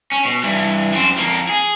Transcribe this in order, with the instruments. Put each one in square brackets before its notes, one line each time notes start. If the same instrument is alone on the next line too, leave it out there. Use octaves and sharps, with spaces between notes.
[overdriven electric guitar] C#4
B2
G2 E3
F#2 C4
F2 A#3
G#4